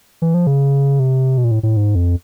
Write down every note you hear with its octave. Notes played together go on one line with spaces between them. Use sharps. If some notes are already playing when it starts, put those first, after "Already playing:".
E3
F3
C#3
C3
B2
A#2
A2
A2
G#2
F2